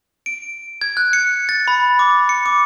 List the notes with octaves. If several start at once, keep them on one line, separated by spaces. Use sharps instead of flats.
D7
G#6
F#6
C#7
A6
B5
D6
C#7
D6